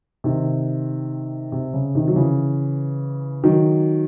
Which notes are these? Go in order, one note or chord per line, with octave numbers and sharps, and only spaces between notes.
C3 D#3
C3
C#3
C3 D#3
F#3
C#3 E3
D#3 F#3